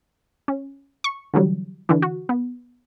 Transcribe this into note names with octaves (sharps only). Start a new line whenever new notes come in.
C#4
C#6
D3 E3 F#3 G3
D3 E3
F#4
B3